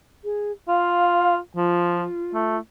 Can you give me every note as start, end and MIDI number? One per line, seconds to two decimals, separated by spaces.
0.24 0.51 68
0.68 1.38 65
0.68 1.32 77
1.56 2.06 53
1.56 2.57 65
2.34 2.57 57